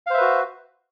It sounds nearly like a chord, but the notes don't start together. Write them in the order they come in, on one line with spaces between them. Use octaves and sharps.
F5 C5 E5 B4 F#4